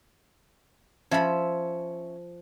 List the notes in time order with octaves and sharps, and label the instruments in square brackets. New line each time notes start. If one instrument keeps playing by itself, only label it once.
[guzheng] F3 B5 [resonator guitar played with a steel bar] C#4 E5